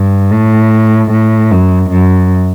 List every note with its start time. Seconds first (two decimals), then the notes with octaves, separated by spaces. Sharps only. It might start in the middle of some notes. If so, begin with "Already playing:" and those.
Already playing: G2
0.32 A2
1.11 A2
1.51 F#2
1.90 F#2